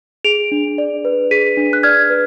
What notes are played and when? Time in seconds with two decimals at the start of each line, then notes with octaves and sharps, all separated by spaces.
0.25 G#4 D7 F7
0.52 D4
0.78 D5
1.05 B4
1.31 G#4 B6 D#7
1.57 D4
1.73 F#6
1.83 D5 F6 G#6
2.10 B4